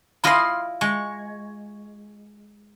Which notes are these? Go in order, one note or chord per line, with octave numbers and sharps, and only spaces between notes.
E4 F4 D#5 B5 C6
G#3 C#6